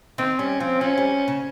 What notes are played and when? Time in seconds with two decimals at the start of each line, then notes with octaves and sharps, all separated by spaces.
0.18 D#3 C4
0.39 G3 C#4
0.60 F3 C4
0.81 F3 C#4
0.97 G3
1.28 C#3